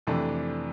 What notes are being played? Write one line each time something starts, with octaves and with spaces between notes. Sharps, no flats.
F2 C3 E3 A3 D4